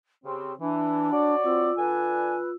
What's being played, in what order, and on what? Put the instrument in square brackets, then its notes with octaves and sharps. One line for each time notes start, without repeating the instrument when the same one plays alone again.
[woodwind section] C#3 C4 [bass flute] G4
[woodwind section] E3 [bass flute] D4
[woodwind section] F#4 C#5 D5
[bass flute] C4 [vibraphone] F4 E6
[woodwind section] D3 D4 G#5 [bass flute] B4